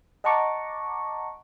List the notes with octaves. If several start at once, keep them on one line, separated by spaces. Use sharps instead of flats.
D#5 F#5 A5 A#5 C#6 D6